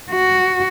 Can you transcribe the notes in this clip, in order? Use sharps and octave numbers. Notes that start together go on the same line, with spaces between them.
F#4